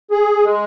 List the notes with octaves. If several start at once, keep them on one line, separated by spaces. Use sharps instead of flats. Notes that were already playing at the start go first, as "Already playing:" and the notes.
G#4
G#3